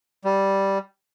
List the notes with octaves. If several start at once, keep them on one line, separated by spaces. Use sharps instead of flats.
G3